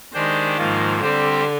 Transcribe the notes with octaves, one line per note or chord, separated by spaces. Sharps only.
D#3 G#3 D4 G4 C5
G#2 F3 A#3 F4
D3 G3 C4 G4 C5